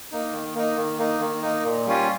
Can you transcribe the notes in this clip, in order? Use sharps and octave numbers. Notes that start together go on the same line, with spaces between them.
A#3 D#4
D#3
A#3 D#4
D#3
A#3 D#4
D#3
A#3 D#4
A#2
G3 C#4 F4